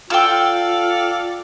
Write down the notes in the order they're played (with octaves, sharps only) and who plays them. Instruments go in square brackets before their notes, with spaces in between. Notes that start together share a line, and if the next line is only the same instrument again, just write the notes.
[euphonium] F4 [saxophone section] A4 D5 F5 [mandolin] G5 E6